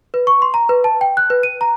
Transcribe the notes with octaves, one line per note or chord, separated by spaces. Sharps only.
B4
C#6
C6
A#5
B4
A5
G5
F#6
B4
D#7
A#5